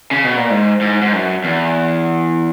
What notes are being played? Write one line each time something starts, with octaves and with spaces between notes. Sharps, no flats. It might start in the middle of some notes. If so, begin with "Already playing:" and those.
C#3
B2
A#2
G#2
G#2
G#2
F#2
E2